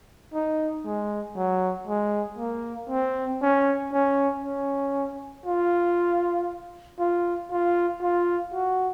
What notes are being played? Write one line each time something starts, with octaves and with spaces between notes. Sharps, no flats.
D#4
G#3
F#3
G#3
A#3
C4
C#4
C#4
C#4
F4
F4
F4
F4
F#4